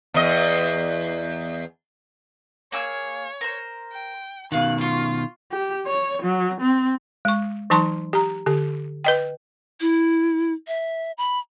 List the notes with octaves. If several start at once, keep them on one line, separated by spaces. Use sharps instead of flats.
E2 D#5
A#3 G#4 C#5 E6
A#4 C5
G5
B2 D#3 F4 F5 F#6
F4 C6 C#6
G4
C#5
F#3
C4
G#3 C#6
E3 F#3 D#4 A5 C6 C#6
G4 A#5
D3 G4
B4 D#5 G5
E4
E5
B5